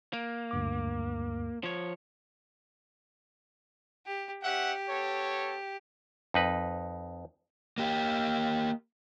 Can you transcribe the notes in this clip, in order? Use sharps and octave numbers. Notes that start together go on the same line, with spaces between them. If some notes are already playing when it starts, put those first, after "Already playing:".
A#3
D2 G2 D6
F3 C#5
G4
C#4 G4 E5 F#5
B3 A4 C#5
F2 D#4 B4
A#3 G4